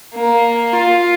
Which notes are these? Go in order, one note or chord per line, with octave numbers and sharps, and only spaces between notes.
A#3
F4